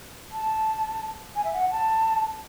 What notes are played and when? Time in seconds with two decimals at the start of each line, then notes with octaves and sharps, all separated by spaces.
0.31 A5
1.35 G#5
1.44 E5
1.52 F#5
1.71 A5